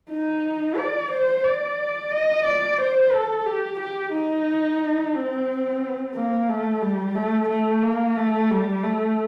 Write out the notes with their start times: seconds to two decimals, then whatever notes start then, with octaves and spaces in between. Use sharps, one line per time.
0.10 D#4
0.78 D5
1.11 C5
1.44 D5
2.12 D#5
2.45 D5
2.79 C5
3.13 A4
3.46 G4
3.80 G4
4.13 D#4
5.15 C4
6.15 A#3
6.49 A3
6.82 G3
7.16 A3
7.49 A3
7.83 A#3
8.17 A3
8.51 G3
8.84 A3